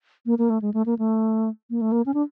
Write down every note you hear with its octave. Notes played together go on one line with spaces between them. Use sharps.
A#3
A#3
A3
G#3
A3
A#3
A3
A#3
A3
A#3
C#4
D4